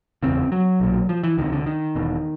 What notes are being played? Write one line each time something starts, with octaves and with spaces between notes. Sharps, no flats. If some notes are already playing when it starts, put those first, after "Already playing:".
F#1 E2 C#3 C4
F#3
B1 A#2
F3
E3
C#2 C3 D#3
D3
D#3
E1 E2 B2